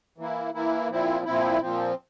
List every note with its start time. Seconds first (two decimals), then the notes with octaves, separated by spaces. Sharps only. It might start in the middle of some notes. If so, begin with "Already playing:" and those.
0.18 E3 A#3 E4
0.54 E3 A#3 E4
0.90 A#2 F3 C4 E4
1.25 A#2 F3 C4 E4
1.61 A#2 F3 C4